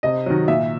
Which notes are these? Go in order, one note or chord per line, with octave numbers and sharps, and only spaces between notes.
C3 D#5
D#3 F#3
A#2 E5